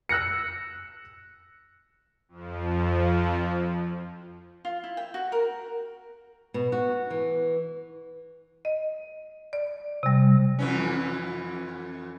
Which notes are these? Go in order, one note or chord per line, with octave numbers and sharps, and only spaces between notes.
E6 F#6 A#6 C#7
F2 F3
F4
E4
G5
F#4
A#4
B2
F#4
E3
D#5
D5
C3 G3
F2 E3 C#4